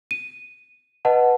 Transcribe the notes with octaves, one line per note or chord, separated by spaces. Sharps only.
D#7
B4 D#5 F#5 A5